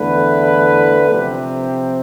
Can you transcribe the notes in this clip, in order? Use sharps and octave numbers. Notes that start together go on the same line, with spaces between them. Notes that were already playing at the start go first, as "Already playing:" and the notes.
Already playing: E2 D3 A3 E4 B4
C3 F3 C4 G4